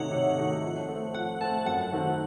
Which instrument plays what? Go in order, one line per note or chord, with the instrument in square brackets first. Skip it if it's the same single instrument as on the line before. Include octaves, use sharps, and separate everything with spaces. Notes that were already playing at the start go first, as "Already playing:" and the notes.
Already playing: [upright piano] C3 D#3 A3 D#4 F#4 [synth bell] C#5 F#5
[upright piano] C3
D#3 A3 D#4 F#4
F3
A3
C4
[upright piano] F3 [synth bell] F#5
[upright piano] A3 C4 [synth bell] A5
[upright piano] F#2 [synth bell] F#5
[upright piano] D#3 A3 C4 F#4